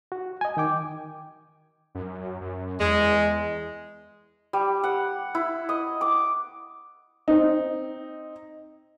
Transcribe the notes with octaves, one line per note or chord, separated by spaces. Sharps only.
F#4
D#5 G#5
D#3 G5 D6
F#2
F#2
E2 G#3
G3
F#5
E4
D#5
D6
C4 D#4